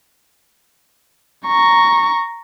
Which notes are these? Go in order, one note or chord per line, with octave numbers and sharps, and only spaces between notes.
A#5 C#6